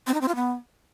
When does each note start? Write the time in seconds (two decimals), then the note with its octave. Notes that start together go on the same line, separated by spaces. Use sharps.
0.07 C4
0.14 D#4
0.21 C4
0.28 F4
0.35 B3